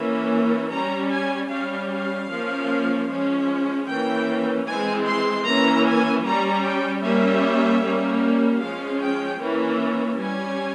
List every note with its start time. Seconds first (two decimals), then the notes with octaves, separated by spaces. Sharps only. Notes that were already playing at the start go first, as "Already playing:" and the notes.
Already playing: E3 A#3 C#4
0.71 G3 C#4 A#5
1.11 G#5
1.50 G3 C#4 F5
1.90 F5
2.29 F3 A#3 C#4
3.08 F3 G#3 C#4
3.87 E3 A#3 C#4 G5
4.66 E3 G#3 C4 G#5
5.06 C6
5.45 E3 A#3 C#4 A#5
5.85 G#5
6.24 G3 C#4 A#5
6.64 G5
7.03 G3 A#3 C#4 E5
7.82 G3 A#3 C#4
8.61 F3 G#3 C#4 F5
9.01 G5
9.40 E3 A#3 C#4
10.19 G3 C#4 G#5